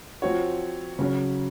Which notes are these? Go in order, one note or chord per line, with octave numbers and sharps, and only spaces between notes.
F3 C4 F#4 C#5
C#3 F#3 C#4